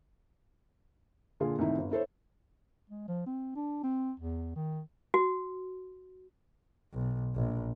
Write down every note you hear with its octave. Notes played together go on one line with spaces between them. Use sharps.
A#2 D3 F4 G#4
C2 A2 D#3 D#4 E4
G1
E4 A4 C5 C#5
G#3
F3
C4
D4
C4
E2
D#3
F#4
B1
A#1